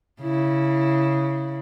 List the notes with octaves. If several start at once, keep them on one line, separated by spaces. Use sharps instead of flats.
C#3 E4